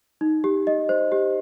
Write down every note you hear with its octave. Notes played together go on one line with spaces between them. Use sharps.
D#4
G4
D#5
C5
G4